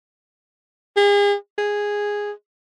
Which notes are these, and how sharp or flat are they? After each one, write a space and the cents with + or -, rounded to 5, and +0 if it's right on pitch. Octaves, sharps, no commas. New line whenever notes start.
G#4 -40
G#4 -5